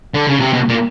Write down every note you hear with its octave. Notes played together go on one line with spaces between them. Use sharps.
D3
C#3
C3
B2
A#2